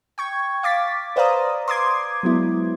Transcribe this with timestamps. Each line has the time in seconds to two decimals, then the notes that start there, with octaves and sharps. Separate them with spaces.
0.18 G5 C#6 G#6
0.63 F5 D6 A6 B6
1.16 B4 C5 D5 F5 A#5 D#6
1.68 C6 D6 D#6 G#6
2.23 F#3 G#3 B3 E4